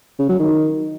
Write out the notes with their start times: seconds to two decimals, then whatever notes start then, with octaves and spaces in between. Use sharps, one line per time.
0.19 C#3
0.29 F#3
0.39 D#3